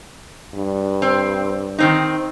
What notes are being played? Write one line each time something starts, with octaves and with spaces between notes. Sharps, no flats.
G2
C4
D#3 C4 D#4